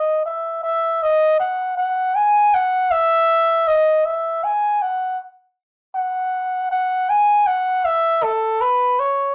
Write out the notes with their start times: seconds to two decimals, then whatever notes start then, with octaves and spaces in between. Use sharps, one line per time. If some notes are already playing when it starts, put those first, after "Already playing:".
Already playing: D#5
0.25 E5
0.63 E5
1.03 D#5
1.40 F#5
1.77 F#5
2.16 G#5
2.54 F#5
2.91 E5
3.67 D#5
4.05 E5
4.44 G#5
4.82 F#5
5.95 F#5
6.72 F#5
7.09 G#5
7.47 F#5
7.85 E5
8.23 A4
8.61 B4
8.99 C#5